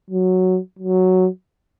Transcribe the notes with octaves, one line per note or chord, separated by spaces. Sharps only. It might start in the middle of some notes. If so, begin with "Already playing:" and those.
F#3
F#3